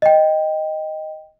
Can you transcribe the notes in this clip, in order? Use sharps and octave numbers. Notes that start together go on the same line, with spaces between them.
D#5 G5